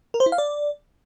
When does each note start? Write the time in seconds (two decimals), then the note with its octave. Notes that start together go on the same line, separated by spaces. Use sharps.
0.14 A#4
0.20 C5
0.26 E4
0.32 F5
0.38 D5